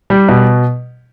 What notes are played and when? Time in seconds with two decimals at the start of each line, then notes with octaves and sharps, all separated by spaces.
0.10 G3
0.29 B2